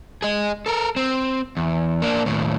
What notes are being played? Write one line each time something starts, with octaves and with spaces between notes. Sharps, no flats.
G#4 D#5
A4 A#4
C4
E2
A#3 D4
D#2 A2